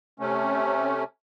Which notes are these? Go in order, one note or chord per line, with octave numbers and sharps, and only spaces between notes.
C3 A3 C#4